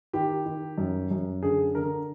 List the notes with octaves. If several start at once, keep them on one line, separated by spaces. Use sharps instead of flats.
D#3 G4
D#3
F#2
F#2
D3 G#4
D3 A#4